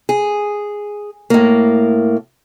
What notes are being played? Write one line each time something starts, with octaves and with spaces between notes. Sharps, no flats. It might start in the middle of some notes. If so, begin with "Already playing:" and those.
G#4
A2 A#3